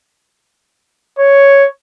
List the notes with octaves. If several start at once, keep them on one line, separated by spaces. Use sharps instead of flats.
C#5